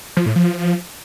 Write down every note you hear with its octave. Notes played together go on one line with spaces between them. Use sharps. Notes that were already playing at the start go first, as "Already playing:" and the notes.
F3
A2
F3